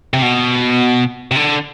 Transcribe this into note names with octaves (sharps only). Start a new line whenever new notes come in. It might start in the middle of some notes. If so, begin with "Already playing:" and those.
C3
B2
C3
D3